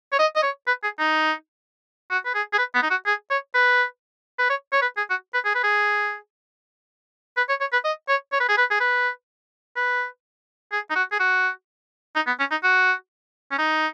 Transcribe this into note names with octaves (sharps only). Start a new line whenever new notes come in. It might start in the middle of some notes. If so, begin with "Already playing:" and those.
C#5
D#5
D#5
C#5
B4
G#4
D#4
F#4
B4
G#4
G#4
B4
B3
D#4
F#4
G#4
C#5
B4
B4
C#5
C#5
B4
G#4
F#4
B4
G#4
B4
G#4
B4
C#5
C#5
B4
D#5
C#5
C#5
B4
G#4
B4
G#4
B4
B4
G#4
D#4
F#4
G#4
F#4
D#4
B3
C#4
D#4
F#4
C#4
D#4